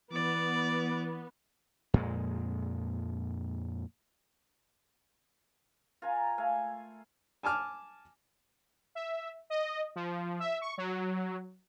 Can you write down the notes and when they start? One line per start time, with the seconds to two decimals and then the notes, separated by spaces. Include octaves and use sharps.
0.12 E3 B3 D5
1.94 F2 A#2 G#3
6.02 F4 A#4 G#5 A#5
6.38 A3 F5 G#5
7.43 G#5 A5 D6 F6
8.95 E5
9.50 D#5
9.96 F3
10.40 E5
10.61 C#6
10.78 F#3